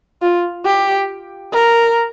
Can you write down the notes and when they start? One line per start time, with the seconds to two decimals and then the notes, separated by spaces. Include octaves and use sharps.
0.22 F4
0.66 G4
1.54 A#4